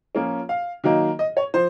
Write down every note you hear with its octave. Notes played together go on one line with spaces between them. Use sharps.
F3 A#3 C#4 F4
F5
D#3 F#3 A#3 D#4
D#5
C#5
F3 C5